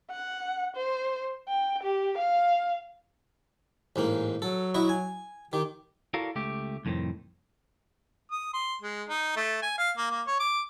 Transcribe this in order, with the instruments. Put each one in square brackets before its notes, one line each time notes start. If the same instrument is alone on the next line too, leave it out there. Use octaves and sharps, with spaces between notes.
[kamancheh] F#5
C5
G5
G4
F5
[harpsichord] A1 G#2 A#3
[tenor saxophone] F#3 [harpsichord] A4
[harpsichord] E4 F#4 D#5
G#5
[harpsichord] D#3 [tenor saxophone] G4
[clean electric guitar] E4 F#4 A4 A#4 D5 F5
C#2 A3 G4
C2 F2 A2 D#3 C4
[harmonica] D#6
C6
G#3
D#4
A3
G#5
F5
A#3
A#3
C#5
D6